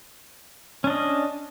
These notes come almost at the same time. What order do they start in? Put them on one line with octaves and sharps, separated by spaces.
C#4 D4 D#5